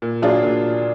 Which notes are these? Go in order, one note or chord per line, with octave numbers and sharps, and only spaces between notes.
A#2
F#3 D4 F4 G#4
A#2